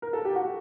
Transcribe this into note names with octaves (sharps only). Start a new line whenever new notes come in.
A#4
A4
G4
F#4